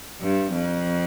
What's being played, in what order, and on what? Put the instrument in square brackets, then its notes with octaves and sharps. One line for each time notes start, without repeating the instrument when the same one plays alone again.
[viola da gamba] G2
F2